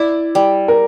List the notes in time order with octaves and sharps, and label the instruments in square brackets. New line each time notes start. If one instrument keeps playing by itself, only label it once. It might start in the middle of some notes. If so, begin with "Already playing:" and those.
Already playing: [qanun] E4 [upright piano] D5
[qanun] G3
[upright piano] A#4